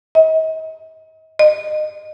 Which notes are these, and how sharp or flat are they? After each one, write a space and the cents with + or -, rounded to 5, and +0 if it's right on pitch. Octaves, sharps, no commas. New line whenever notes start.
D#5 +40
D#5 -25